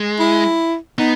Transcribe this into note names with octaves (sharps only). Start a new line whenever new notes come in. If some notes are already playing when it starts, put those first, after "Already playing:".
Already playing: G#3
E4
B3 D#4